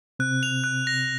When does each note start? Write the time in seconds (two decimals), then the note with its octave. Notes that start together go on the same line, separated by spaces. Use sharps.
0.19 C3 C4 F#6
0.43 F7
0.64 F#6
0.87 A#6